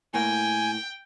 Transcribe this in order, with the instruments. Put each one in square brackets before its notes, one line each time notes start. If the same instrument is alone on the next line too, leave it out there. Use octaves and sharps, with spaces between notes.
[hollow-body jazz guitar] A2 A#3 [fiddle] G5 [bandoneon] G#5